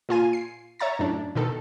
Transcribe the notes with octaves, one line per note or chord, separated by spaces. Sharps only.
A#2 F4 G#5 D#7
C7
C#5 E5 A#5 A6
F#2 A2 D4
B2 D#3 A4